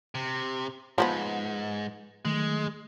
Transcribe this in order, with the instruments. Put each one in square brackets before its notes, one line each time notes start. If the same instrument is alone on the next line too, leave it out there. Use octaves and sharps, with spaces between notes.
[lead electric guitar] C3
[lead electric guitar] G#2 [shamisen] F3 A#3 B3
[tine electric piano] D#3 F#3 A3 [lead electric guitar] G#3